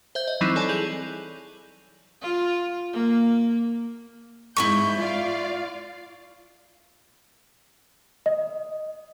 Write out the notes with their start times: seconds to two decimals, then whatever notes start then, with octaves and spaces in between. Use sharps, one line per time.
0.15 C5 E5 G6
0.28 D#5
0.41 E3 F#3 G3 C4 D#4 E4
0.56 A4 C#5 D5 G#5 A5
0.69 G#4 G6 F7 F#7
2.22 F4
2.93 A#3
4.56 G#2 E4 A#4 C#6 G6
4.98 F4 D5 F5
8.26 D#5